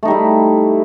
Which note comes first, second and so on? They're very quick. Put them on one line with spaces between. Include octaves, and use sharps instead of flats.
A3 D#4 G3 E4